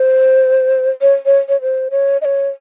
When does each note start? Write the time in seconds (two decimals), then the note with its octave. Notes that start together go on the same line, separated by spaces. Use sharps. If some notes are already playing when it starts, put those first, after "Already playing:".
Already playing: C5
1.01 C#5
1.26 C#5
1.49 C#5
1.62 C5
1.91 C#5
2.21 D#5
2.25 C#5